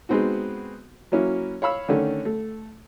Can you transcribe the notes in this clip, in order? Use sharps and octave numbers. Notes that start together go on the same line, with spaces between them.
G#3 B3 C4 D#4 F#4
F#3 A#3 C#4 E4 F#4
C#5 F5 B5 E6
D3 D#3 A3 C#4
A3